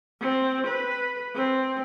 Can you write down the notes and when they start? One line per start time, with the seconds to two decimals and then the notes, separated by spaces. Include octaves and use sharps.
0.21 C4
0.67 B4
1.36 C4